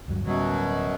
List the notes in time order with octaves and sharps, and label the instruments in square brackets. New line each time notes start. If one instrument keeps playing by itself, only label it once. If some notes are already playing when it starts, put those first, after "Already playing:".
[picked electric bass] D2 G2 F#3
[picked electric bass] D1 G3 [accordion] F#2 B2 F#3